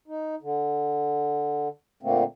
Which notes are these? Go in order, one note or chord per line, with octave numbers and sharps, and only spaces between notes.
D#4
D3
A#2 D3 A3 A#3 C4